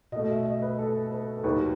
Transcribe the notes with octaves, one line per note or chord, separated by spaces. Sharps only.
B2 A3 D#5
E5
D#5
B4
A4
B4
A4
D#2 D#3 F#3 B4